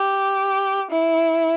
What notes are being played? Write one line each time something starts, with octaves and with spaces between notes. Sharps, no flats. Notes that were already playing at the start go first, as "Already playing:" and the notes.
Already playing: G4
E4